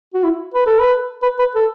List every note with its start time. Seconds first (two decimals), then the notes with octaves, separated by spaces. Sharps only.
0.14 F#4
0.24 E4
0.54 B4
0.67 A4
0.80 B4
1.23 B4
1.39 B4
1.56 A4